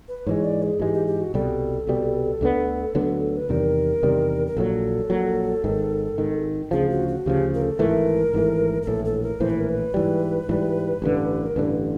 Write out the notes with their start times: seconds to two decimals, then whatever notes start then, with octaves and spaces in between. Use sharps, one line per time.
0.08 B4
0.27 G#2 E3 G#3 C#5
0.44 D5
0.63 G#4
0.80 G#2 E3 G#3 G4
0.94 G4
1.07 G4
1.20 F#4
1.34 C2 B2 G3 A4
1.87 C2 B2 G3
2.41 D2 D3 F#3 B3
2.95 D2 D3 F#3 B3
3.37 B4
3.49 E2 C3 D#3 G3 A#4
4.03 E2 C3 D#3 G3
4.47 A#4
4.57 A#1 A#2 F#3 A4
5.10 A#1 A#2 F#3
5.64 G#1 G#2 D#3
6.18 G#1 G#2 D#3
6.71 D2 C#3 F3 G#4
6.90 F#4
7.08 F#4
7.25 D2 C#3 F3 G4
7.54 A#4
7.62 A4
7.79 G#1 G#2 E3 A3 A#4
8.33 G#1 G#2 E3 A3
8.82 A#4
8.87 A#1 A2 E3 A4
9.05 A4
9.23 A#4
9.40 A#1 A2 E3 C5
9.50 B4
9.60 A#4
9.69 B4
9.94 G#2 E3 G3
10.49 G#2 E3 G3
11.02 A1 G2 D3
11.46 A#4
11.56 A1 G2 D3 B4